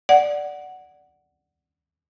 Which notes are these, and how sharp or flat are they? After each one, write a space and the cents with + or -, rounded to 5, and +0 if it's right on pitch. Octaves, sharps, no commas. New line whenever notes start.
D5 +0 F#5 +0